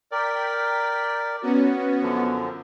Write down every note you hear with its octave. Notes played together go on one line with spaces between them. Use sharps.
A#4 D5 G5 B6
B3 C#4 F#4
F#2 D3 F3